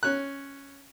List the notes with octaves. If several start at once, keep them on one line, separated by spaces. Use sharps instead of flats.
C#4 F#6